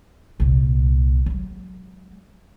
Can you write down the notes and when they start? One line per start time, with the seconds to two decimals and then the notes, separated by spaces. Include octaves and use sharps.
0.40 C2 A#2
1.26 F#3 G#3